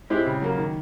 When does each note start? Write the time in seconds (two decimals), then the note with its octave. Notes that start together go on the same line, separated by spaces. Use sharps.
0.10 G#3 C4 E4 G4
0.26 C#3
0.42 F#3 A#3
0.58 D#3